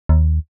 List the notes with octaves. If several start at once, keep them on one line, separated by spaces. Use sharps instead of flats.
D#2